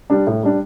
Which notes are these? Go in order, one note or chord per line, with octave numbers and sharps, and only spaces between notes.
G3 D4
A2
G3 D4